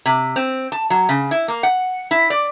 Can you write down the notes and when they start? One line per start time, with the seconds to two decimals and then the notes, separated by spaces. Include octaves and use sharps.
0.05 C3
0.36 C4
0.72 A5
0.90 F#3
1.09 C#3
1.31 E4
1.48 A#3
1.63 F#5
2.11 E4
2.30 D5